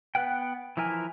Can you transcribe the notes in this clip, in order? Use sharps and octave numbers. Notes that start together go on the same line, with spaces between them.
B3 B4 F#5 G5
E3 F3 E4 A#4 G#5